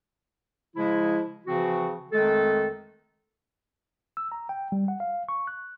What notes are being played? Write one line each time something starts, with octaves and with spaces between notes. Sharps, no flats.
C#3 F3 G#3 E4
C#3 E3 F3 C4 F#4
F2 D#3 G#3 A3 A4
E6
A#5
G5
G3
F#5
F5
C#6
F#6